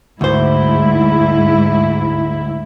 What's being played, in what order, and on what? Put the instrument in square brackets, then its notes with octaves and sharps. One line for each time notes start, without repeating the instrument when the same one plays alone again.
[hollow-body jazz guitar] D2 C5 [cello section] G#2 E4